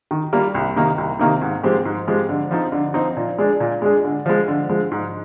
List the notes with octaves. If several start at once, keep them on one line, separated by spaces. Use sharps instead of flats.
D#3
G3 A#3 F4
C2
C3 D#3 A#3 D#4
C2
C3 D#3 A#3 D#4
G#2
F3 G#3 C4 G4
G#2
F3 G#3 C4 G4
D3
F3 C4 D#4
D3
F3 C4 D#4
A#2
G#3 D4 G#4
A#2
G#3 D4 G#4
D3
F3 G#3
D3
F3 G#3
G#2